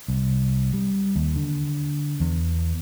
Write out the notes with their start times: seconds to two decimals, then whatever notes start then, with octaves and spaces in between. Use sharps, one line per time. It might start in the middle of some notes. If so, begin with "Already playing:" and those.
0.08 C2
0.73 G3
1.16 D#2
1.36 D3
2.20 E2